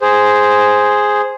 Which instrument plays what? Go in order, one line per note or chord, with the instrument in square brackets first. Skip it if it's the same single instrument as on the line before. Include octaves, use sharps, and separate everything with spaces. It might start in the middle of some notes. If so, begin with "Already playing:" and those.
[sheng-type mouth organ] G#4 C5